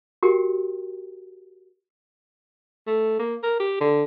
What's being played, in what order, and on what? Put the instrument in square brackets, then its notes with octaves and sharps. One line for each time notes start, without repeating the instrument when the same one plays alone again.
[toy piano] F#4 G4 A#4 G5
[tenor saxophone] A3
A#3
A#4
G4
D3